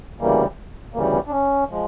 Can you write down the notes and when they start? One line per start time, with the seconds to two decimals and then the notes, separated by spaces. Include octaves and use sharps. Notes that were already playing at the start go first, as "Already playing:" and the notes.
0.20 D2 C#3 E3 G3 A#3
0.94 D2 C#3 E3 G3 A#3
1.13 B3
1.27 D4
1.31 C#4
1.69 F3 G#3